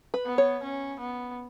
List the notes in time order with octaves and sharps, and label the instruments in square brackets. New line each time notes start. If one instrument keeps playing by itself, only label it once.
[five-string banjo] B4
[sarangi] B3
[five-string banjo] C#5
[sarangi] C#4
B3